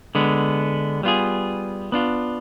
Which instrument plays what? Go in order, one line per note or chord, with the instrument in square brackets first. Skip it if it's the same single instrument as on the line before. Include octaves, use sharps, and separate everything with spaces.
[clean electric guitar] D3 G#3 B3
G3 B3 F4 G#4
B3 D4 F4